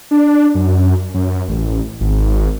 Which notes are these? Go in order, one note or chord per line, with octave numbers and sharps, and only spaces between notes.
D4
F#2
F#2
A1
G#1